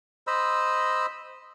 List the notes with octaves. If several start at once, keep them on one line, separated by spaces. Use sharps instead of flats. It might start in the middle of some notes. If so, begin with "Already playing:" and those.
C5 D#5 B5 E6